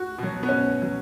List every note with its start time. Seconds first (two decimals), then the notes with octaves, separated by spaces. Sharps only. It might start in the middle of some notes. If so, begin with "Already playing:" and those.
Already playing: F#4
0.18 B2 F#3
0.43 B3
0.49 C#4
0.82 F#3